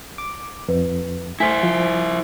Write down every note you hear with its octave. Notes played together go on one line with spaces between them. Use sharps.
D6
F2 B4
A3 E4 C5 G#5 B6
F3